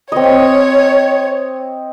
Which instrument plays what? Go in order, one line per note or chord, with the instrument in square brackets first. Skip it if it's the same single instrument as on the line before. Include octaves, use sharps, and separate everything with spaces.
[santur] C4 D#5 [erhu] C#5